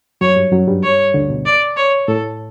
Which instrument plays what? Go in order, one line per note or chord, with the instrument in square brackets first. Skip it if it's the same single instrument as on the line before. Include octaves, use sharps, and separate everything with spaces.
[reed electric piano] F#2 F#3 [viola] C#5
[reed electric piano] G2 G3
F#2 F#3
G2 G3
[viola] C#5
[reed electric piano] D2 D3
B2
[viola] D5
C#5
[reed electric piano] A2 [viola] A4